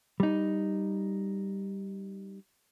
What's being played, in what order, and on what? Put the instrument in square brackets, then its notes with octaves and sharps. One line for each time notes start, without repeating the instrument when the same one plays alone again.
[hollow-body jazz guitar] G3 D#4